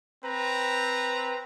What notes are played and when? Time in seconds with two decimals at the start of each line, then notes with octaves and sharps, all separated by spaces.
0.23 C4 B4 A#5